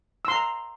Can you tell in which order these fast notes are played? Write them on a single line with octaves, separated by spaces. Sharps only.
E6 C6 A#5